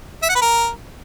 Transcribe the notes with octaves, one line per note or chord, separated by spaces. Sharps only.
E5
F#5
B4
A#4